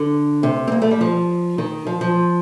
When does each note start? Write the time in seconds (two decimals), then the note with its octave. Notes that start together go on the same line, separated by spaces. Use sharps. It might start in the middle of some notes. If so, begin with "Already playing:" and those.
Already playing: D3
0.43 C3
0.67 C4
0.72 A#3
0.82 A3
0.91 G3
1.01 F3
1.58 D#3
1.87 F3
2.01 F3